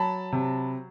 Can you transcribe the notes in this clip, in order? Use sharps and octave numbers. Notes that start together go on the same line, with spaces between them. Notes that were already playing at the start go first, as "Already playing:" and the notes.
Already playing: F#3 A5 B5
C3